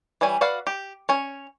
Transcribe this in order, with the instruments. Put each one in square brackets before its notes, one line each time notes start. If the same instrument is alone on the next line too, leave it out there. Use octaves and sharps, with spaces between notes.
[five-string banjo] E3 G3 C#5 G#5
F#4 B4 D5 F5 F#5
G4
C#4 C#5